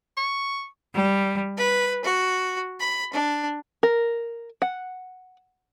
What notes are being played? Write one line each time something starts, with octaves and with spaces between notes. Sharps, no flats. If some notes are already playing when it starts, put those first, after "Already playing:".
C#6
G3
B4
F#4
B5
D4
A#4
F#5